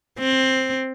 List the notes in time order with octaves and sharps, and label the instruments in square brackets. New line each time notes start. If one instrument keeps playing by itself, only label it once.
[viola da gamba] C4